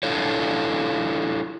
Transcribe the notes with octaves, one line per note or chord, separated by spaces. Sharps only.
D4 E4 F4 A4 C#5